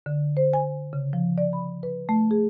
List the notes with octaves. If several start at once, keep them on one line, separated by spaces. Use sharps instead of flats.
D3
C5
G#5
C#3
F3
D5
B5
B4
A3
G#4